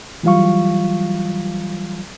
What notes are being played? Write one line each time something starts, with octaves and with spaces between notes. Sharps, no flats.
E3 F#3 G3 F4 F5 C#6